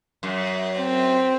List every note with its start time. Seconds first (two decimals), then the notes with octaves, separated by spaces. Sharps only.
0.23 F#2
0.79 C4